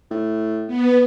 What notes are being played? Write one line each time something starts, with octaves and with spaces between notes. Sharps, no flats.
A2
B3